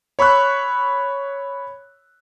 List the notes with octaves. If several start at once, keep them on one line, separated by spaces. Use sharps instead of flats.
C#5 B5 C#6 E6 F#6